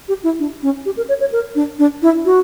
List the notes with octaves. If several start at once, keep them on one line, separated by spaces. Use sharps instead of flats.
G4
E4
D4
C#4
G4
A#4
C#5
C#5
A#4
D4
D4
E4
F#4